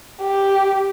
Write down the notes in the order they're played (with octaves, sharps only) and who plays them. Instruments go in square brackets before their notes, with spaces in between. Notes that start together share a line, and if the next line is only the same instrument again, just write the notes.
[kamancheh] G4